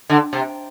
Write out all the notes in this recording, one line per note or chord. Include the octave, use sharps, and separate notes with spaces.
D3
C3